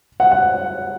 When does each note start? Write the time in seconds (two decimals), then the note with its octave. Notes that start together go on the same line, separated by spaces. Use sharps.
0.20 F#5
0.32 F#5